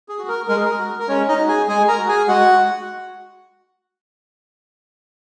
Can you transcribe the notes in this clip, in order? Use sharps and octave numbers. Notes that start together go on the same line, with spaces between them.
G#4
F#4
A#4
G#3 A#4
G#4
A#4
F#4
A#4
G#3 C#4 C#5
D#4 D#5
F#4
G#4 G#5
G#3 G#4 G#5
A#4 A#5
F#4
G#4 G#5
G#3 F#4 F#5
F#4